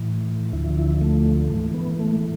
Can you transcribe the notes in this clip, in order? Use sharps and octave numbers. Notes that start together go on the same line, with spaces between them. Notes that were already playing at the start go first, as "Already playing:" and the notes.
Already playing: A2 E3
D2 D3 F3 E4
E4
A3
G#2 E3 A3
B3
A3